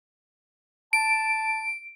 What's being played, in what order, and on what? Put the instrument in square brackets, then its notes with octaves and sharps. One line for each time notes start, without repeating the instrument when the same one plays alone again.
[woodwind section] A5 [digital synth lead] D7